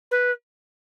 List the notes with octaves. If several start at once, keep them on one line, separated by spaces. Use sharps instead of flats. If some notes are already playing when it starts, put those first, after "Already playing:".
B4